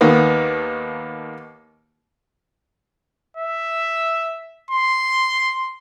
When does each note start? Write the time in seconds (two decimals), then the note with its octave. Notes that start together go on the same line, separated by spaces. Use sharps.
0.01 D#2 D#3 A#3 B3
3.37 E5
4.71 C6